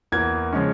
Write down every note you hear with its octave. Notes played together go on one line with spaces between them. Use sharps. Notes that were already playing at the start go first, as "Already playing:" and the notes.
E2 E3 A#3 G#6
C#3 F3 G#3 C#4